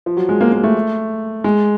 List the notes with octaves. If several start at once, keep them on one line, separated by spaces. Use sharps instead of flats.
F3
F#3
G#3
A#3
A#3
A3
G#3